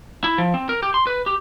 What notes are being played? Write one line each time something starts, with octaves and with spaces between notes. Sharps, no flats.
E4
F3
C4
A#4
G4
C6
B4
G4